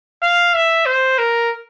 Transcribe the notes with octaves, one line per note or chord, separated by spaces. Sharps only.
F5
E5
C5
A#4